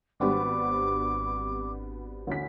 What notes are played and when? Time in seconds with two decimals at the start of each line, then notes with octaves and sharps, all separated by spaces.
0.20 G#1 G3 B3 C4 D4 F#4 D6
2.27 A1 D2 B6